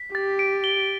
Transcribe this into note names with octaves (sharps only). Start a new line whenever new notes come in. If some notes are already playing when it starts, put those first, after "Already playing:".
Already playing: B6
G4 A6
D7
G7